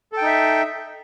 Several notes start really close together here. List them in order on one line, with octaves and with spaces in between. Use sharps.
A4 G5 D#4 E5